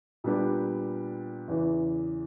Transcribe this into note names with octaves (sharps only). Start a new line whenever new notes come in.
A#2 G3 B3 D4 G4
E2 C#3 E3